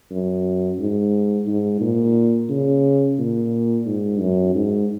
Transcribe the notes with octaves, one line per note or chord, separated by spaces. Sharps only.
F#2
G#2
G#2
A#2
C#3
A#2
G#2
F#2
G#2